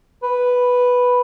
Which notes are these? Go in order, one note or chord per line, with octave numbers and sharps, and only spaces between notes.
B4